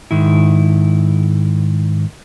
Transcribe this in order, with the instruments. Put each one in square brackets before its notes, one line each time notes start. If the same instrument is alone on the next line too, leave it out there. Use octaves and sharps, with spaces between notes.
[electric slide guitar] G#2 D#3 E4